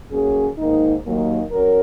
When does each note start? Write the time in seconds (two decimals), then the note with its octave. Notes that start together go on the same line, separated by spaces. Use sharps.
0.11 F#3 A#3 C#4 G#4
0.57 G#2 D#3 A#3 D#4
1.04 D#2 D#3 F#3 A#3 D#4
1.51 F#3 C#4 A#4